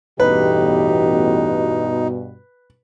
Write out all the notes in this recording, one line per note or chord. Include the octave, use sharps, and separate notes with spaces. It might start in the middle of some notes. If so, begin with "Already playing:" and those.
A1 E2 G2 B2 D#4 G4 B4